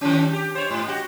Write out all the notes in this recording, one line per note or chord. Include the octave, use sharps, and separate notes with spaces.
D#3 G3 C#4
G4
C5 C#5
G#2
F#4 G4